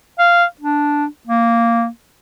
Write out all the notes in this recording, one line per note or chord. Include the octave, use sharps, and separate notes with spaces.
F5
D4
A#3